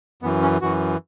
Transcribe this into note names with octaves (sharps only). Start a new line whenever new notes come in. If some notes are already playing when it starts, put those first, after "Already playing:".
F#2 E3 B3
C#4
F#2 E3 F#4